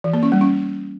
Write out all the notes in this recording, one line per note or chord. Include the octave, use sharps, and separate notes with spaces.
E3
A#3
C#4
G3
C#4